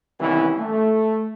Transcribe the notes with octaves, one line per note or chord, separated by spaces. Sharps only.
C2 D#3 E3 B3 C#4 E4
A3